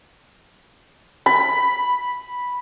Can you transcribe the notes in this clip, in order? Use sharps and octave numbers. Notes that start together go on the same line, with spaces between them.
B5